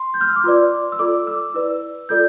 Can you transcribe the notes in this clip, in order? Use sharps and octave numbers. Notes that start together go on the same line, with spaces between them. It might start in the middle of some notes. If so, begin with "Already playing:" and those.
Already playing: C6
G6
F6
E6
D6
F4 B4 D5 C6
E6
F4 A4 D5 D6
E6
E4 B4 D5
F4 A4 D5 G6